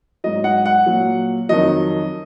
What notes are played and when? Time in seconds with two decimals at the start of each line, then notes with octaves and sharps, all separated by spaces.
0.24 G#2 F#3 D#5
0.44 F#5
0.66 F#5
0.86 A#2 F#3
1.49 F2 D#3 F#3 D#5